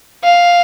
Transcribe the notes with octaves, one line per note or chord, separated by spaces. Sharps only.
F5